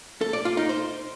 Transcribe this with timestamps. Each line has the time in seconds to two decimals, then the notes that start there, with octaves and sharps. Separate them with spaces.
0.21 A4
0.33 D5
0.45 F4
0.57 D#4
0.69 C5